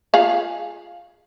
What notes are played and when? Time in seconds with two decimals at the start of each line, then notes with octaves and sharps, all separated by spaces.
0.14 F4 G#4 F5